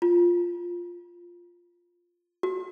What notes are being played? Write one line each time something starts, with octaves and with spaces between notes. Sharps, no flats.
F4
F#4